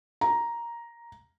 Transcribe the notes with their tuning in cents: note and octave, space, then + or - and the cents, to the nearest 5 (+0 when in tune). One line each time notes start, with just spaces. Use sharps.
A#5 +5